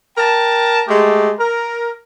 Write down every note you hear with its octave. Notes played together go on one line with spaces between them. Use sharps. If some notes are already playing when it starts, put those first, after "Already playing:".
A#4 G5 A5
G#3 A3 G4
A#4